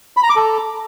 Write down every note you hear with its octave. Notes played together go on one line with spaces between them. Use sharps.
B5
A#5
D6
A4